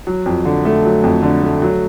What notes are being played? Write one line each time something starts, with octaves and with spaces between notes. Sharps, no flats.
F#3
F2
D3
A3
F#3
F2
D3
A3
F#3